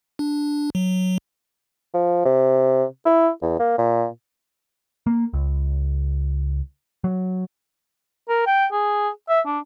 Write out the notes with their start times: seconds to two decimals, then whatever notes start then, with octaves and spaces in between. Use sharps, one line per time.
0.19 D4
0.75 F#3
1.94 F3
2.25 C3
3.05 E4
3.42 E2
3.59 A#3
3.78 A#2
5.07 A#3
5.33 C#2
7.04 F#3
8.29 A#4
8.47 G5
8.72 G#4
9.29 E5
9.46 D4